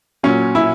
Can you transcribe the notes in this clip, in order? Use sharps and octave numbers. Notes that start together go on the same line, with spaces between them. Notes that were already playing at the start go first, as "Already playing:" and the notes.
A#2 F#3 C#4
E4